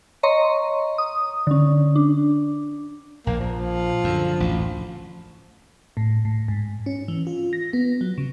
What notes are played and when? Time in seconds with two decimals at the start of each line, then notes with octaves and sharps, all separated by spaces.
0.23 C#5 D#5 A#5 C6 C#6
0.98 D#6
1.47 D3 C#4
1.96 D4
3.26 A#1 A#3
3.40 F3
4.04 F#2 D3
4.40 A1 D2
5.97 A2
6.25 A2
6.48 G#2
6.86 C#4
7.08 E3
7.27 F4
7.53 A#6
7.73 B3
8.01 F#3
8.18 C#3